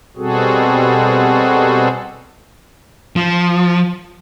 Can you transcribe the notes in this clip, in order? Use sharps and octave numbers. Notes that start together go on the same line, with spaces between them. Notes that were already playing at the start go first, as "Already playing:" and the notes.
B2 G3 C4 F#4 G#4 A4
F3